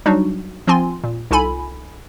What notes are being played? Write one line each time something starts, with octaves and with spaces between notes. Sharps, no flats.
F#3 G3 D4 D#4 F#4
F3 C4 F4 G#5 C6
A#2
C2 D#4 F4 A4 G#5 B5